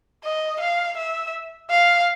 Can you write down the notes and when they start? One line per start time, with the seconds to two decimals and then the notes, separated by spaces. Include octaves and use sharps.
0.24 D#5
0.60 F5
0.97 E5
1.70 F5